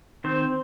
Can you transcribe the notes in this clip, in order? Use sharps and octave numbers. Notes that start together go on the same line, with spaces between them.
D#3 C4 C5